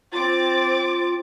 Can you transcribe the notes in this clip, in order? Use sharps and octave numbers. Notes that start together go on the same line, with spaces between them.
C4 F4 D6 A6